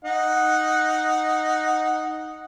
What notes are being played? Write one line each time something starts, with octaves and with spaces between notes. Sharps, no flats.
D#4 F#5